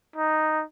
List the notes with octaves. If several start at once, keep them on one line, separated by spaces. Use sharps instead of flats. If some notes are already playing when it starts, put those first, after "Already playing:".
D#4